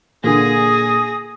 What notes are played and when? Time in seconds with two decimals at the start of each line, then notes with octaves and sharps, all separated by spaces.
0.24 A#2 D3 G#4 G#5 D#6 A#6